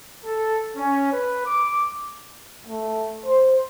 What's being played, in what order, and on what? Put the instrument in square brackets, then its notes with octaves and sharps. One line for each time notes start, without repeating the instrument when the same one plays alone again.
[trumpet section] A4
C#4
B4
D6
[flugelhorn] A3
C5